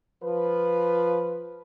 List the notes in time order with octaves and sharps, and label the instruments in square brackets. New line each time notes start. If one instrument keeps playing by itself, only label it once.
[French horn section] F3 B4